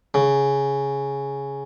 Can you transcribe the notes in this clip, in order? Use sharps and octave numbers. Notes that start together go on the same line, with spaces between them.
C#3